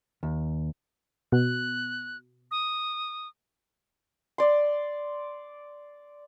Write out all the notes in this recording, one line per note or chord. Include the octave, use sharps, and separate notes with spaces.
D#2
B2 F#6
D#6
D5 C6